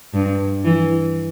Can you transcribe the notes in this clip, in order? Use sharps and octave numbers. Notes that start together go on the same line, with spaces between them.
G2
E3